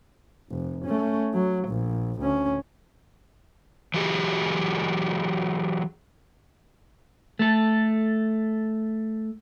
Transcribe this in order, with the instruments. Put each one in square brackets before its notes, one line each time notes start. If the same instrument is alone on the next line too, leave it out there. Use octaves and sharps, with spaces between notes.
[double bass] F1
A3 C#4
F#3
A#1
D2 C#4
[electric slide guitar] E3 F#3 G4 G#4
[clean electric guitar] A3 A4